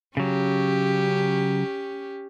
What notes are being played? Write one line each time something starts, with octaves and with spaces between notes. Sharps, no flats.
C#3 F#3 C#4 G4